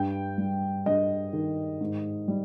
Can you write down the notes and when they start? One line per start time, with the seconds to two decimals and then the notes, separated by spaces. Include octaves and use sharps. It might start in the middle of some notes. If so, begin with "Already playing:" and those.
Already playing: G2 G5
0.38 G3
0.86 G2 D#5
1.33 D#3
1.81 G#2
2.28 G3